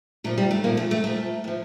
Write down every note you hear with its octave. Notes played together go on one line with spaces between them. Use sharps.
A#2 F3 A3
G3
A3
A#2 F3 A#3
A3
A3
A#2 F3 A3
A2 F3